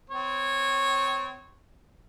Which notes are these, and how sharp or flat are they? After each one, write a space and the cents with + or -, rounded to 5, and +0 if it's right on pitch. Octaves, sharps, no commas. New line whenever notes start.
C4 -30 C#5 -15